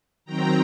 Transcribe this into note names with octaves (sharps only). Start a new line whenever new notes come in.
D#3 F#3 C4 G5 A#5